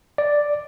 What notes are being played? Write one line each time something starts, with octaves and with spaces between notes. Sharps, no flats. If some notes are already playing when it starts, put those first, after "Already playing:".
D5